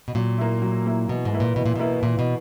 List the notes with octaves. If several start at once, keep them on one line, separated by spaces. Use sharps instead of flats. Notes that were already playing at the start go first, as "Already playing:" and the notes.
B2
A#2 F#3
A#3 E4
F#3
A#3 E4
B2 E3
G#2
A#3 E4 B4
A#2
B2 E3
A#2
B2 A#3 E4 B4
A#2 E3
B2